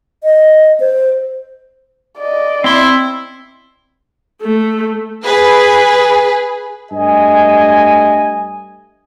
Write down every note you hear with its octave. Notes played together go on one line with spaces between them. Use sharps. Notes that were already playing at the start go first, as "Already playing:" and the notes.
D#5
C5
D5 D#5
C4 E4 C6
A3
G#4 B4
G2 A3 D#5 G#5